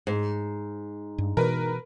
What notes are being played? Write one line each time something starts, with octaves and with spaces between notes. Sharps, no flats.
G#2
G2
B2 E3 A#4 B4